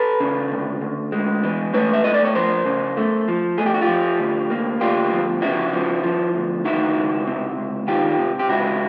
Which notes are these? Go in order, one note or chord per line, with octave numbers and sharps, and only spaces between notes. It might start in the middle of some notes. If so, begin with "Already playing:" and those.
Already playing: A4 B4
C#3
D2
D2
G#3
E3
A3 B4 C#5
E5
A3 D#5
D5
C#5
F3 A#4 C5
C#3
A3
F3
A3 G#4
G4
F#4
F4 G4
F3
D2
A#3
D2 F4 G4
F3
C#3 E4 F#4
F3
F3
D2
D#3 E4 F#4
C#2
C3
C#2
D#3 F4 G4
C3
G4
C#2 E4 F#4